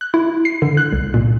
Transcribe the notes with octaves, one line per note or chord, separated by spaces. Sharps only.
F#6
E4
C7
D3
F#6
C2
A#2